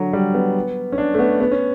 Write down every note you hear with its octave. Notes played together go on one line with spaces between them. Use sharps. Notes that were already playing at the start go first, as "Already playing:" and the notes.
Already playing: D3 F#3
G3
B3
C#4
D4
A3
B3
B3
C#4